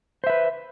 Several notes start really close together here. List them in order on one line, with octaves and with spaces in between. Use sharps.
C5 E5 B4